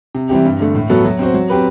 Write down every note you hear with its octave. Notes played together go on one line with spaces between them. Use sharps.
C3
E3 G3 C4 G4
G2
D3 A3
A2
F#3 B3 F#4 A4
F#3
C4 F#4 C5
F#3
C4 G4 B4